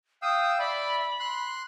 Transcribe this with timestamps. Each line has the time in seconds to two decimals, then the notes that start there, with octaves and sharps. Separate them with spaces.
0.22 F5 G5 D#6 E6
0.59 D5 E5 B5
1.20 C6 F#6